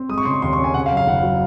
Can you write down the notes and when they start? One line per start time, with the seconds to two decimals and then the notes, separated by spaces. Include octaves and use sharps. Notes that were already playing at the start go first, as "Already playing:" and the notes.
Already playing: C4
0.09 G#3 D#6
0.18 C#6
0.25 C#3 C6
0.33 C#6
0.42 D#2 C6
0.53 C#6
0.58 C#4
0.64 G#5
0.74 C#3 F#5
0.86 F5
0.91 F#2
0.97 F5
1.07 F#1 F#5
1.23 F#3